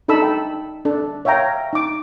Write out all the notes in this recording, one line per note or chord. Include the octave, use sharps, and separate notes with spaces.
D4 D#4 A4 B5 E6
G5
D4 A4
C#5 E5 F5 G5 A#5
D#4 D6